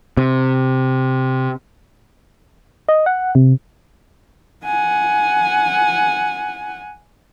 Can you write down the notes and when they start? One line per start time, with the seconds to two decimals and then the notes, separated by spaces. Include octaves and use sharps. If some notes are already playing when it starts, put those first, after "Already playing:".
0.17 C3
2.89 D#5
3.06 F#5
3.35 C3
4.65 F#5 G#5